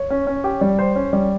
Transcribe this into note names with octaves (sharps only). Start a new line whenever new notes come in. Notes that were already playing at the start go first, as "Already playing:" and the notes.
Already playing: C#5
C#4
C#4
G4
G3
C5
C#4
G3